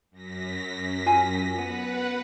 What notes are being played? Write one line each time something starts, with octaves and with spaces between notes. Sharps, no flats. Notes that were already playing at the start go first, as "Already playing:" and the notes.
F#2 A#6 B6
F4 G#5
B3 B4 F#5